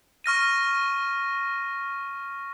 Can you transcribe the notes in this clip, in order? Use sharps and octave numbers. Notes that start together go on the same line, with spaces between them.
C#6 F6 A#6 D#7